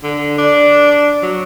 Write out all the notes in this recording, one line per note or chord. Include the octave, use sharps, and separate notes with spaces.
D3
D4
F#3